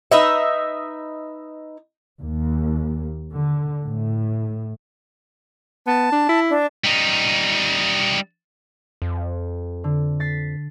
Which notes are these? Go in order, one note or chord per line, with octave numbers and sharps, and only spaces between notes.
D#4 B4 D#5 E5
D#2
D3
A2
B3 A5
D4
E4
D4
G3 D#4
F2
D3
A6 B6 C7